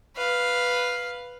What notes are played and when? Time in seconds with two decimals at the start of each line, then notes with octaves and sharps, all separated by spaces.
0.16 B4 F5